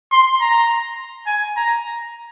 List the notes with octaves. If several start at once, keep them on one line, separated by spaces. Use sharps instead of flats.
C6
A#5
G#5
A#5